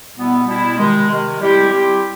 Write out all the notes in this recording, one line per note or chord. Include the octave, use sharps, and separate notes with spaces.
B2 G3 B3 E4
B2 G3 B3 E4
C3 D#3 G#3
C3 D#3 G#3
G3 C4 E4 G4
G3 C4 E4 G4